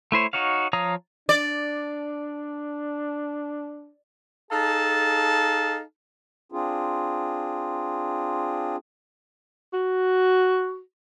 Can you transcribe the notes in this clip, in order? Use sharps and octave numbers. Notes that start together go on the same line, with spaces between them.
A3 E4 C5 C#5
D#4 F#4 C#5 F5
F3 C#5 F5 A#5 D#6
D4 D5
D#4 G#4 A4 F5 A5
C4 D4 F4 G#4
F#4